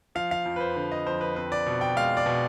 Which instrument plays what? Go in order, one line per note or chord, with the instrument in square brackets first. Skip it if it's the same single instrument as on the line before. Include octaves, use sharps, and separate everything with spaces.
[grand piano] F3 F5
F5
F2
B4
C5
D3 C5
D#5
F2 C5
B4
C4 B4
D5
B2
G5
G#3 F5
D5
B2